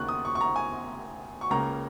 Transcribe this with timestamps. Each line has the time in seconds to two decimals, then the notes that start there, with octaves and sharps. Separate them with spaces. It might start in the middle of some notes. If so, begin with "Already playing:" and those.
Already playing: D#2 C#3 A#3 C#6 F#6
0.09 D#6
0.25 C#6
0.35 C#6
0.41 A#5
0.56 G#5
1.41 C#6
1.50 C#2 C#3 A#3 A#5